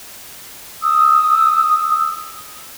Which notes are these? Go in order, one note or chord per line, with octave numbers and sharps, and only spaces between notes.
D#6 E6